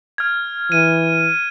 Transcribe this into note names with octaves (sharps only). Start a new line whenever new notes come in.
F6 G#6
E3 D#7